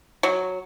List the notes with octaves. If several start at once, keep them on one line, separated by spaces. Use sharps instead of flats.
F#3